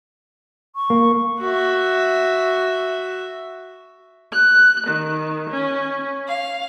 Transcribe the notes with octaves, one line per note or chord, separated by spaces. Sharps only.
C#6
A#3
F#4 E5
F#6
D#3
C#4
F5